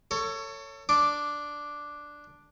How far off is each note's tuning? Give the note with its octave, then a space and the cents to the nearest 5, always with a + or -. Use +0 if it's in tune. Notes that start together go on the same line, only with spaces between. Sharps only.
A4 +30 C#5 +5
D4 +0 D6 +0